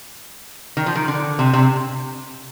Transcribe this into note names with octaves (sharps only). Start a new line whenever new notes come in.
D#3
F3
D#3
D3
C3
C3